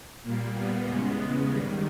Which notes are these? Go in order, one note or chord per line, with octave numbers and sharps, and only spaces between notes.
A#2 G3 A#3
B3
E2 C#3 G#3
G#2 D#3 G3